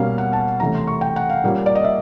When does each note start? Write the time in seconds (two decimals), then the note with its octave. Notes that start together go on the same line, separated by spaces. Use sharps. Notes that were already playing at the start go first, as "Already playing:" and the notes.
Already playing: B2 G3 A#3 C#4 F5
0.18 F#5
0.33 A5
0.60 C3 E3 A3 C#4 A#5
0.75 C6
0.87 C#6
1.01 G5
1.16 F#5
1.30 F5
1.44 A#2 G3 A#3 C#4
1.66 D5
1.75 D#5
1.84 E5